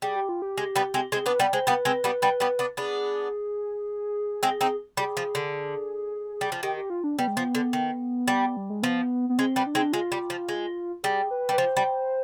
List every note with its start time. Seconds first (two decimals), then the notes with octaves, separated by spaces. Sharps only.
0.02 G3 G#4
0.16 G4
0.29 F4
0.42 G4
0.58 G#3
0.76 G3 B3
0.94 G#3 C4
1.12 G#3 C4 G#4
1.26 B3 D4 B4
1.40 G3 B3 D5
1.53 G#3 C5
1.67 G3 B3 B4
1.85 G#3 C4
2.04 G3 B3
2.22 G3 B3
2.40 G3 B3
2.59 B3 D4
2.77 B3 D4 G#4
4.43 G#3 C4
4.61 C4 D#4
4.97 G3 G#4
5.17 F3
5.35 D3
6.41 G3
6.52 F3
6.63 D#3 G4
6.76 G4
6.90 F4
7.04 D4
7.19 G3 B3
7.27 G#3
7.37 F3 B3
7.55 D3
7.73 D#3
8.28 G3
8.57 G3
8.70 G#3
8.83 F3 B3
9.29 B3
9.38 G#3 C4
9.56 G3 B3
9.66 D4
9.74 G#3 C4 D#4
9.82 D4
9.93 G#3 F4
10.12 G3
10.30 F3
10.49 G#3
11.03 G3 G#4
11.31 B4
11.49 G3 B4
11.58 F3 C5
11.77 G3